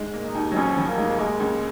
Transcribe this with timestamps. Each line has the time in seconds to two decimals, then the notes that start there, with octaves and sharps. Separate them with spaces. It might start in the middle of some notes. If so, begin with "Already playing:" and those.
Already playing: G#2 G#3
0.13 A#2 A#3
0.24 D#4
0.35 D#2 D#3
0.52 F#3
0.55 F2 F3 C#4
0.77 F2 F3
0.87 A#3
0.98 G#2 G#3
1.19 A#2 G#3 A#3
1.40 C#2 C#3